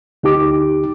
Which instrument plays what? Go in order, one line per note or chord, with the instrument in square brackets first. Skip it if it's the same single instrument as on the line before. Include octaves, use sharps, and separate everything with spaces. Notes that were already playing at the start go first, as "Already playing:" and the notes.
[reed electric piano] D2 D#4 G4 D6